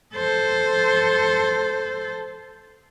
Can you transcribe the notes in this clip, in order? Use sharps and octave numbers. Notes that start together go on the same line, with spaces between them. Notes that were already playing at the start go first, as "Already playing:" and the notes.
A4 C5